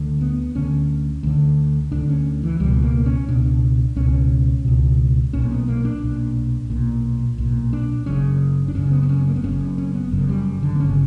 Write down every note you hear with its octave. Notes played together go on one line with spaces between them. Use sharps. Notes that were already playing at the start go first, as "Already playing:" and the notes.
Already playing: D2 D3
B3
D2 D3 C#4
D2 D3
D2 D3 D4
C#4
E3
C#2 B2 G3
A#3
C#4
C#2 B2 D4
C#2 B2 C#4
C#2 B2
B1 A#2 C#4
B3
A#3
D4
B1 A#2
B1 A#2
B1 A#2
D4
F#1 F#2 C#3 C#4
D4
F#1 F#2 C#3 C#4
B3
B3
C#4
A#3
B3
F#1 F#2 C#3 C#4
C#4
B3
F#1 F#2 C#3
G3
D3
B3
G1 C#3 C#4